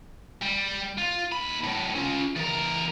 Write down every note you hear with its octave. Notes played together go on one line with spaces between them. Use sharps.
G3
F4
D#2 B5
A2 F#3
C#4 F4
E2 A#4